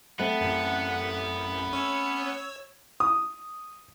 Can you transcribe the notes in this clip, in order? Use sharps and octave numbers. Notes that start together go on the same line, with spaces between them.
A3 B3 C4 F#5
A1 F#2
C#4 C#5 E6
D#6